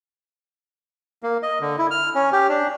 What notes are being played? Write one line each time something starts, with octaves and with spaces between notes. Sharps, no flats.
A#3
D#5
D3
E4
F6
C#4
G4
D4